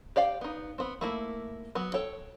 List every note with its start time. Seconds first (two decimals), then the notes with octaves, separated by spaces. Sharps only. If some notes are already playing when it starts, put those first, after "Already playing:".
0.16 G4 D5 F5 G5
0.41 B3 D#4
0.78 B3 C4
1.01 A3 A#3 E4
1.75 F#3 B3
1.94 A4 C#5 G5